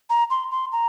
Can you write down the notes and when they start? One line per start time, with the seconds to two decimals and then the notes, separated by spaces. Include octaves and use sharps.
0.10 A#5
0.30 C6
0.51 C6
0.72 A#5